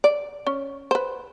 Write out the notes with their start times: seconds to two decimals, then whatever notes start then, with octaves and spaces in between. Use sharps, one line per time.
0.04 D5
0.47 C#4
0.91 B4 C5